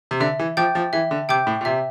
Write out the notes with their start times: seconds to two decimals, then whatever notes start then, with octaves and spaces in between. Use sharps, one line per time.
0.11 C3
0.20 D3 E5
0.39 E3
0.57 F3 G5 D6 G6
0.75 F3
0.93 E3 E5
1.11 D3
1.29 C3 G5 D6 G6
1.47 A2
1.61 A#2
1.65 C3 E5